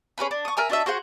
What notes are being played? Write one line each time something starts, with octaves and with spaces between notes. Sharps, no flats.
C#4 G#4 B4 B5
D4
C#6 D#6
A#4 E5 G#5 A#5
D4 F#4 D#5 E5
F#4 G#4 C5 F#5